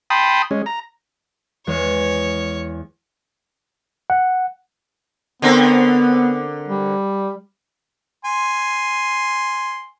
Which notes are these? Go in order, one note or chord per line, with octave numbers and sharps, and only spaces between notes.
G5 A5 B5 C6 D#6
G#3 C#4
A#5
E2 G#3 C#5
F#5
D3 B3 C4 A#4
G3
G#5 C6